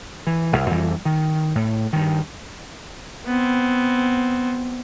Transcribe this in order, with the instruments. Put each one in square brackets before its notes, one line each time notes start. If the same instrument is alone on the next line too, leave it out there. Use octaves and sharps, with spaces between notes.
[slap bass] E3
E1 C2
F2 E3 F3 G3
D#3
A2
G2 D#3
[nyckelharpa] B3 C4